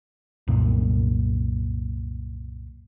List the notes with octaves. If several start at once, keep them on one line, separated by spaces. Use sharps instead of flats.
C2 F#2 A#2